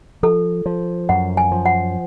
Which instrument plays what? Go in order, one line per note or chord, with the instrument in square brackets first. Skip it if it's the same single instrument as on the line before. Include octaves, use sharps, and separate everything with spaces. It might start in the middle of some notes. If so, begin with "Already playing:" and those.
[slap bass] F3 [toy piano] A4
[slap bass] F3
[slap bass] F#2 [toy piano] F#5
[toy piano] G#5
[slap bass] F3
[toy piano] F#5